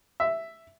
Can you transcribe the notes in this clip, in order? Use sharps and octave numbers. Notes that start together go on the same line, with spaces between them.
E5